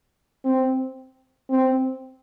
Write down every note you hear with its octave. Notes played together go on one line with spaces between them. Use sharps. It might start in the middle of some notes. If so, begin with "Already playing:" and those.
C4
C4